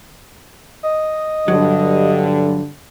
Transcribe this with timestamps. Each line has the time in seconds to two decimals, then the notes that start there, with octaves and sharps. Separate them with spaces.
0.83 D#5
1.48 G2 D3 F#3